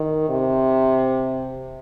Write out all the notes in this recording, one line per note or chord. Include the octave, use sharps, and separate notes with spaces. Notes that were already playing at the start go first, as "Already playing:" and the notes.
Already playing: D#3
C3